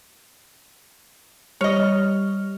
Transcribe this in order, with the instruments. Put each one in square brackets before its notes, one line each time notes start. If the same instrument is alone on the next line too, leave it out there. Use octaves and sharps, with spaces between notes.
[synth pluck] G3 F6 [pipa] C#5 D#5